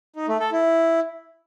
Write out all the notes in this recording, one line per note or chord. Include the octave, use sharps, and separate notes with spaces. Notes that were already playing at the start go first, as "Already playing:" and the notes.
D#4
A3
A4
E4